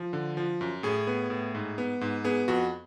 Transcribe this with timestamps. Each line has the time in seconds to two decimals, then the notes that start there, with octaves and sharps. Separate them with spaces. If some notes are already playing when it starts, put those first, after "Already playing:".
Already playing: F3
0.13 D3
0.37 F3
0.61 F#2
0.83 A2 G#4
1.07 B3
1.30 A2
1.55 G#2
1.78 B3
2.01 G#2
2.24 B3 G#4
2.48 F2 F#4